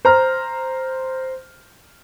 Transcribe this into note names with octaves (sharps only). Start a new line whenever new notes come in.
C5 A#5 F6